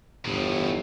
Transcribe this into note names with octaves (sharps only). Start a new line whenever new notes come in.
G1 E2 A2